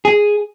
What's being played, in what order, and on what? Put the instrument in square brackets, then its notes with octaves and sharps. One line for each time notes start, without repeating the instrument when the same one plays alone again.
[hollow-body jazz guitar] G#4